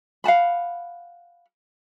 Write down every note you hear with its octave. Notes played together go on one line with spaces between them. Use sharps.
F5 F#5 A5 B5